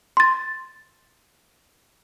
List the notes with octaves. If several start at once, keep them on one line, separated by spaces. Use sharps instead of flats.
C6 A6